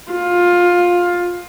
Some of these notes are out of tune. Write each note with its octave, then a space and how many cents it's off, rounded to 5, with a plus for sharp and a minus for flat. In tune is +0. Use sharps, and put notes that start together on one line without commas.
F4 +15